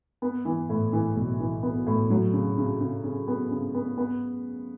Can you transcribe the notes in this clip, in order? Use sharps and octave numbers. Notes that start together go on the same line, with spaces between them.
B3
E3
A2
E3
B1
E3
B3
A2
F#3
C#3
C#3
C#3
C#3
B3
C#3
B3
B3